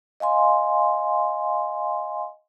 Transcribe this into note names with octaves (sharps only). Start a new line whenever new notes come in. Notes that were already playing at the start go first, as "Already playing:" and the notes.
D#5 F5 G#5 C6